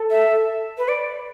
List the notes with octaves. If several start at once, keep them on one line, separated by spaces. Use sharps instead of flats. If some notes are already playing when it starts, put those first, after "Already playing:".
Already playing: A4
E5
B4
D5